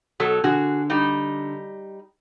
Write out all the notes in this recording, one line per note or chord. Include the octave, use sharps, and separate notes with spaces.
B2 F#3 A4
D3 F#4 G#4
G3 D#4